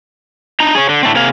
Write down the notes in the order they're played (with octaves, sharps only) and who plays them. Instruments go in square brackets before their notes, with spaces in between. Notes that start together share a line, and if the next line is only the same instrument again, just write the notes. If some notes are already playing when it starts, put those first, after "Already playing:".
[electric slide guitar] D4 D#4 A#5
G#4 C#5
D3
A2 D3 A3 C4
C3 A#3 G#4 F5